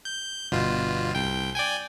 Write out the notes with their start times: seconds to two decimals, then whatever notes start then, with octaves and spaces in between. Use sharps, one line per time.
0.05 G6
0.52 G1 B2 F4
1.15 C2 G5
1.55 D5 G5 G#5